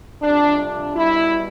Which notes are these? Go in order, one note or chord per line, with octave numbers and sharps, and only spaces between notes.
F2 C3 G3 D4
D4
B2 G3 E4